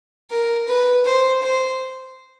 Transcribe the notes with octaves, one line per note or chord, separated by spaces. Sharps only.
A#4
B4
C5
C5